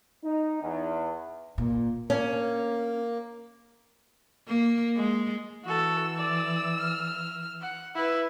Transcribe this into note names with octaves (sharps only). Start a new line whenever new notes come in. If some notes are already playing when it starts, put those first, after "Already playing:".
D#4
E2
A#2
A#3 C#4
A#3
G#3
E3 F#4 A4 E6
D5
F6
F#5
E4 B4